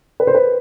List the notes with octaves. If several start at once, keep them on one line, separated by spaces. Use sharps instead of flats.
B4
C5
B4